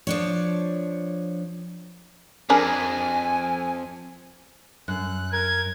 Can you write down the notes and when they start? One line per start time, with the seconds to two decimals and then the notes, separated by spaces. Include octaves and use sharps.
0.07 F3 D4 C#5
2.50 F2 D4 G#4 A#4 G#5
4.88 F#2 F#6
5.32 A#4 G#6